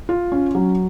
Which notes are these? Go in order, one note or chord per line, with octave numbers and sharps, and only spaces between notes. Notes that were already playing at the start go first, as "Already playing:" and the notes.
F4
C#4
F#3